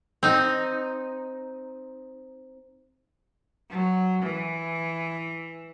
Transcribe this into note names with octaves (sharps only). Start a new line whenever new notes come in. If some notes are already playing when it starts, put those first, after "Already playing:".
C4 D#4
F#3
E3